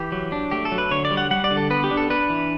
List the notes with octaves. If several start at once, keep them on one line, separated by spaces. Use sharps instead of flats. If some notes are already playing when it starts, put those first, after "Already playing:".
Already playing: E3 G4
F#3
D4
A3 G4
A4
F#3
B4
D3 C#5
D5
G3
F#5
G3 F#5
D5
D3
A4
B3 B4
G4
D4
A4
D4 B4
E3